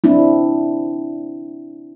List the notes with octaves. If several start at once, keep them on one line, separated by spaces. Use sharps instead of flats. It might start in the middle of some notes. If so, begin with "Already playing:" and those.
C4 D4 E4